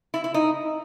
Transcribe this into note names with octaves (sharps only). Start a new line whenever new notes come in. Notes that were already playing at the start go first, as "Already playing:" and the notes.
E4
E4
D#4